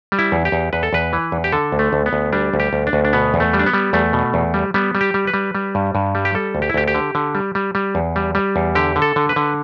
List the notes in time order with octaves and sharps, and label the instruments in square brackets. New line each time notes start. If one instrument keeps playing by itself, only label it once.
[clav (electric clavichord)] G3
E4
E2
G4
E2
E2 B4
A4
E2 B4
E3
E2
G4
D3 A4
D2
A3
D2
B3
D2
G3 D4
D2
G4
D2
D4
D2
D4
B2 B3
E2
A3
G3
D4
B3
G3
E2 A3
B2
E2
G3
G3 B3
G3
G4
G3
B4
G3
G3
G2
G2
G3
G4
G3 A4
D2
G4
E4
D2 G4
G4
D3
D3
G3
G3
G3
E2
G3
G3
E2
D3 G4
D3
A4
D3
B4
D3